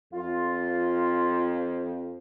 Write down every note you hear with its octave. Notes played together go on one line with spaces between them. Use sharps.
F2 F4